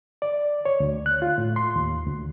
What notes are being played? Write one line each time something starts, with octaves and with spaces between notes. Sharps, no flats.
D5
C#5
D2
F#6
F4
A2
C6
D#2
D2